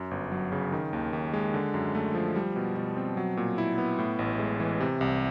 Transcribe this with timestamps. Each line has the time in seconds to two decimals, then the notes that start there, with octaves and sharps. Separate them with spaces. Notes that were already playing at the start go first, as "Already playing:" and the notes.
Already playing: F#2
0.11 G1
0.32 F#3
0.52 C#3
0.72 D#3
0.93 D#2
1.13 D#2
1.33 G#3
1.54 D3
1.74 F#2
1.95 A3
2.15 F3
2.35 G3
2.56 B2
2.76 B2
2.96 C4
3.17 F#3
3.37 A#2
3.58 E4
3.78 B3
3.99 A2
4.19 A1
4.39 G#3
4.60 E3
4.80 C3
5.01 C2